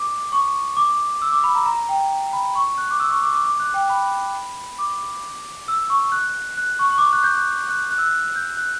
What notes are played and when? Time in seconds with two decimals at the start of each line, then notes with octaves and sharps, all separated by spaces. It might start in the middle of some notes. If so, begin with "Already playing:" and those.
Already playing: D6
0.32 C#6
0.77 D6
1.22 E6
1.32 D6
1.44 B5
1.55 A#5
1.66 A#5
1.89 G5
2.33 B5
2.55 C#6
2.78 F#6
2.91 D6
3.00 E6
3.11 C#6
3.22 D6
3.33 D6
3.44 D6
3.60 F#6
3.74 G5
3.90 B5
4.78 D6
5.68 E6
5.90 C#6
6.12 F#6
6.57 F#6
6.79 C#6
6.90 C#6
6.98 D6
7.01 C#6
7.13 F#6
7.23 G6
7.35 F#6
7.69 F#6
7.91 F#6
7.98 E6
8.06 F#6
8.36 G6
8.57 F#6